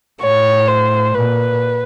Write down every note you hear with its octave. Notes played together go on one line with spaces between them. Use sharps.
A2 C#5
C5
A#2 B4